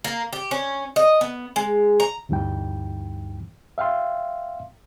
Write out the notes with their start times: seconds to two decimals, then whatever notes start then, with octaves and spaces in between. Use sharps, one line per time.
0.05 A#3
0.33 G4
0.51 C#4
0.96 D#5
1.21 B3
1.56 G#3
2.00 A#5
2.29 D2 G2 E3 G3 D#4 G5
3.78 E5 F5 G5 C6